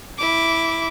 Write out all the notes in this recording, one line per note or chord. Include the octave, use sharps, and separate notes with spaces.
E4 D6